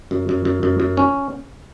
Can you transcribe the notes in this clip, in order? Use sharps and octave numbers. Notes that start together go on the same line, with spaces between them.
F#2
F#2
F#2
F#2
F#2
C#4